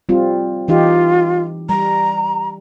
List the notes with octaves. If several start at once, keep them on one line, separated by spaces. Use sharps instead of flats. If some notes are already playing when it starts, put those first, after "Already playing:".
G3 C4 F4
E3 D#4 F4 G4
G3 A#5